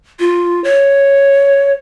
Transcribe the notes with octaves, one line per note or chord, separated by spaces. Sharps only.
F4
C#5